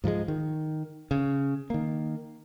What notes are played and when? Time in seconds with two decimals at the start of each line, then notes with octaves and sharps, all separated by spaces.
0.04 G#2 F3 F#3 G#3
0.28 D#3
1.11 C#3
1.70 D#3 A#3